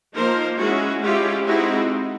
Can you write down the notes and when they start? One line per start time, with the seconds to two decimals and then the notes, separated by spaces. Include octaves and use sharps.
0.14 F3 A#3 D#4 A#4 C5
0.58 G#3 C#4 E4 F#4 G#4
1.02 G#3 C#4 E4 F4 G4
1.46 G#3 C4 D#4 E4 F#4